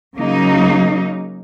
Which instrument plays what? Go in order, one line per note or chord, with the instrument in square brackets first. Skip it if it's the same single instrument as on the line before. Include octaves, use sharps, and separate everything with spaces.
[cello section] C#3 F#3 A#3 D#4